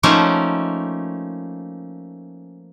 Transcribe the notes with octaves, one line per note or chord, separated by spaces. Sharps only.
F3 A3 A#3 C#4 D#4